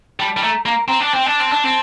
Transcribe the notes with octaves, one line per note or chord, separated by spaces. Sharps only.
G3 A5
G3
A3 A#5
A#3 A#5
C4 A#5
D4 A5
C4 G5
D4 A5
C4
D4
C4